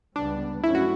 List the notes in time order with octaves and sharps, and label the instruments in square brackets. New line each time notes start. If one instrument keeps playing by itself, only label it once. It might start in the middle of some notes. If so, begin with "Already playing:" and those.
[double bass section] C#2 C#3 G3 B3 [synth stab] D4
[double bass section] G2 F#3 A3 C#4 [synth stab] E4
[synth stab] F#4